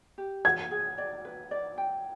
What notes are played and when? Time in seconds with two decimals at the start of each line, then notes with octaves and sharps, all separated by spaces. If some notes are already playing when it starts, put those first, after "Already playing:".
0.18 G4
0.45 G#4 G#6
0.71 G#4
0.98 D5
1.25 B4
1.51 D5
1.78 G5